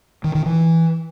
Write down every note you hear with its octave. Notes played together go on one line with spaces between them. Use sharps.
D#3
D#3
E3